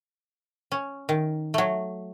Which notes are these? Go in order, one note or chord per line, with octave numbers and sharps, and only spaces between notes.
C#4
D#3
F#3 A3